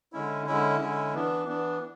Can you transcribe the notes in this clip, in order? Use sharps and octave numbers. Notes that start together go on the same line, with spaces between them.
D3 G#3 C#4 E4
D3 G#3 C#4 E4
D3 G#3 C#4 E4
E3 B3 D4
E3 B3 D4